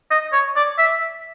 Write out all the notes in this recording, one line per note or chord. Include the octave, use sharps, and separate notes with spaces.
D#5
C#5
D5
E5